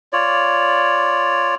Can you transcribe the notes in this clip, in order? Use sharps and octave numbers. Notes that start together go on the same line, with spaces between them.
F4 C#5 D5